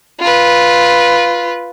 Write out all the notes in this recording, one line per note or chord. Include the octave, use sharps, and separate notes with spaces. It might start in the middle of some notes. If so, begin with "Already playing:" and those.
F4 B4